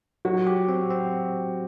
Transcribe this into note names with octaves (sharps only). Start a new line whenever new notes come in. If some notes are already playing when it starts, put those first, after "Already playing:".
F#3 F#4
G4
C4
C4